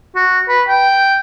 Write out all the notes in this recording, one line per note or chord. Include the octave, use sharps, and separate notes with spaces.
F#4
B4
G5